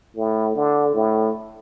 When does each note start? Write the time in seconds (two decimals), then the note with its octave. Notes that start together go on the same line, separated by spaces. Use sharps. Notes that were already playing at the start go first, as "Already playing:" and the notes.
0.17 A2
0.56 D3
0.95 A2